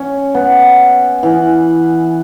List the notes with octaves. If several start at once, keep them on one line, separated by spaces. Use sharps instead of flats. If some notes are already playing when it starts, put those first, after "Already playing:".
Already playing: C#4
B3
E3